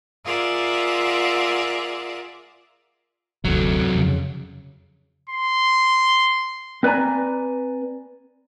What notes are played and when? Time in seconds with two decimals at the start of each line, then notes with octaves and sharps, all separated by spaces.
0.24 F4 G#4 A#4 D5 E5 F#5
3.45 F#1 D2 C3 F#3 A4
3.95 F2 C#3
5.30 C6
6.83 C4 B4 D5 G#5 A#5